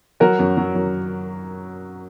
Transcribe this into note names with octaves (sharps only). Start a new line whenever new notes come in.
F#3 F#4 A#4
F#2
F#3
F#2